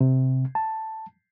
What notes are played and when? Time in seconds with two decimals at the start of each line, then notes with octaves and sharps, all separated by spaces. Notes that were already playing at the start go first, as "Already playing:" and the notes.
0.01 C3
0.55 A5